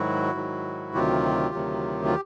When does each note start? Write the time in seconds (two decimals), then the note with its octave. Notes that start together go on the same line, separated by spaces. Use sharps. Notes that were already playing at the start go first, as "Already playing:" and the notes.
Already playing: G#2 D#3 F#3 E4 F#4
0.34 G#2 D#3 F#3
0.94 D2 C3 D#3 F#3 F4 G4
1.54 D2 C3 D#3 F#3
2.05 F4